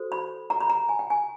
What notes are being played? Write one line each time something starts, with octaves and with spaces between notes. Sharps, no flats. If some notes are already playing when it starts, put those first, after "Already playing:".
Already playing: F#4 A4 C5
B5
A#5
B5
A#5
G#5
G5
G#5